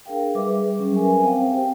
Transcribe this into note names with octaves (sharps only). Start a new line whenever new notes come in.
D4 G#4 A#4 F5 G5
G3 G#4 B4 E5 D6
F#3 G3 C#4 G#4
A#4 B4 E5 G#5
C4 C5 F5 G5
G4 C5 G5